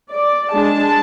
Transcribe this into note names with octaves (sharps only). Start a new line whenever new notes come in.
D5
G#3 D4 A5